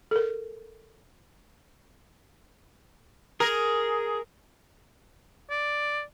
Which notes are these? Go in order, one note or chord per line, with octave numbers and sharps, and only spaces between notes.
A4 A#4
G#4 A#4
D5